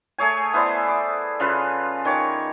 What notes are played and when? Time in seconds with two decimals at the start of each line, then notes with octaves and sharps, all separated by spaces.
0.18 A3 G#4 C#5 G#5
0.53 B3 E4 C5 D5
0.88 D6
1.40 C#3 F4 B4
2.05 D#3 C#5 D6